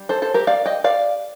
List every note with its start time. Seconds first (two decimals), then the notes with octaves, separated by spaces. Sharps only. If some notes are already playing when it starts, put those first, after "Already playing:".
Already playing: G3 D4
0.09 A4 C5
0.22 A4 C5
0.34 G4 A#4
0.47 D5 F5
0.66 D#5 G5
0.84 D5 F5